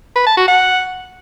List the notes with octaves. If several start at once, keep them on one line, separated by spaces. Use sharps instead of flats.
B4
A5
F#4
F#5